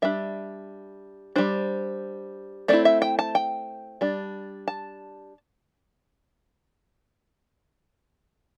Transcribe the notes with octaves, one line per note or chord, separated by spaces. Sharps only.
G3 D4 E5
G3 D4 C5
A3 C4 E4 D5
E5
G5
A5
G5
G3 D4
A5